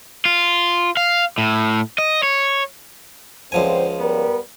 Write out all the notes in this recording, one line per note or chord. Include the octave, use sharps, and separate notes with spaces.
F4
F5
A2
D#5
C#5
C#2 D3 F3 C4 C5 G#5
G3 B3 A#4